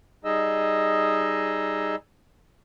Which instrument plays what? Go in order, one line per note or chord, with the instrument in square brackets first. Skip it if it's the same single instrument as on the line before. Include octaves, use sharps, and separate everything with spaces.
[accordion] G3 D#4 G#4 D#5 E6